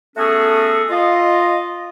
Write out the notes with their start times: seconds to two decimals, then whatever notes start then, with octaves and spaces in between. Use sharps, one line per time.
0.17 A3 B3 C#4 F#4 G#4 A4
0.90 F4 D#5